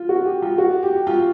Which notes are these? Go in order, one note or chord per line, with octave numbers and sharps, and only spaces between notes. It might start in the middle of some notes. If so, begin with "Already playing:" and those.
Already playing: F4
F#4
G4
F4
F#4
G4
F4